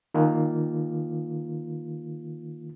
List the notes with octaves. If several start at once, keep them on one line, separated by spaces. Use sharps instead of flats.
D#3 A#3 F4